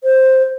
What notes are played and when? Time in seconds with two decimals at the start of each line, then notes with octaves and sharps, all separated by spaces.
0.04 C5